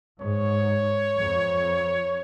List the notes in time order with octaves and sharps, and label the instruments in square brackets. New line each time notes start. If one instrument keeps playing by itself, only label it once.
[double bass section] G#2 [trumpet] C#5
[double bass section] F2